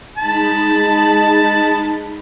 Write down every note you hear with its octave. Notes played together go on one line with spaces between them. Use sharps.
G#3 D#4 A5 B5